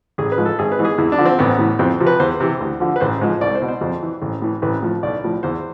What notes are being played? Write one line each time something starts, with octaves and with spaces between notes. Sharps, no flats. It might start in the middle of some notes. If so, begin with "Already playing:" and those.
A1 G#4
B4
G#2 F3
A4
G#1 G#4
B4
G#2 E3
G#4
E2 E4
D4
D3 F3
C4
A1 B3
A2 E3
F2 C4
C3 F3
B4
E2 C5
C3 E3
D2
D3 F3
B4
A1 C5
G#2 F3
C2 D5
C5
B2
C5
F2
E3
A1
A2 E3
A1 B4
A2 F3
B1 D5
A2 F3
E2 C5